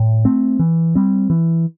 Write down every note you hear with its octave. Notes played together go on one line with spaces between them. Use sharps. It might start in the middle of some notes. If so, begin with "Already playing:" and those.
Already playing: A2
A3 C4
E3
G3 C4
E3